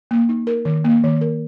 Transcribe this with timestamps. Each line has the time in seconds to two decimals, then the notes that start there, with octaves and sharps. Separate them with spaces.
0.11 A#3
0.29 D#4
0.47 A#4
0.65 D#3
0.84 A#3
1.04 D#3
1.21 A#4